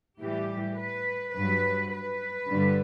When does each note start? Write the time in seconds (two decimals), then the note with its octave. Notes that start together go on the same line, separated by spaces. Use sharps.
0.20 A2 E3 G3 G4
0.77 B4
1.34 G2 F#3 B4
1.91 B4
2.49 G2 D3 G3